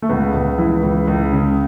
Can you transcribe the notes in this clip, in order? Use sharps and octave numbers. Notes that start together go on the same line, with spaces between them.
A3
C#2 B3
C#2
E3
C#2
C#2
C#3